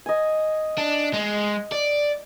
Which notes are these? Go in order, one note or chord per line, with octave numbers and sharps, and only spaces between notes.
D#5 G#5
D4
G#3
D5